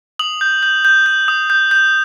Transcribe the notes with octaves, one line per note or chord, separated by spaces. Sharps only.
D#6 F#7
G6
G6
G6
G6
D#6
G6
G6